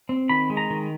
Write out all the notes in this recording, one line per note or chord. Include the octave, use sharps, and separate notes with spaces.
C4
D#3 B5
G#3
A#5
D#3